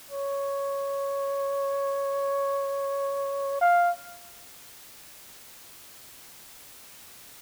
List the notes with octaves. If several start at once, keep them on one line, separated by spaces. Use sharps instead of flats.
C#5
F5